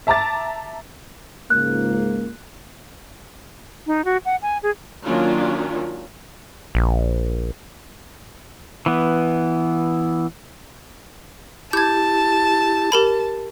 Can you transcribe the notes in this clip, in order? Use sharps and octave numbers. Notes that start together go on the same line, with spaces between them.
E5 A5 A#5 D6 A6
C#2 G#2 A#3 F#6
D#4
F#4
F#5
G#5
G#4
D#3 F#3 A#3 C#4 D4 F4
A#1
E3 B3
E4 G4 A5 G6 G#6
G4 A#4 B5